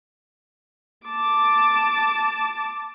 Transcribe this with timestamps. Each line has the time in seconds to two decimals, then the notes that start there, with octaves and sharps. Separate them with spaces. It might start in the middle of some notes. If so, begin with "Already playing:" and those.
1.07 A5 D6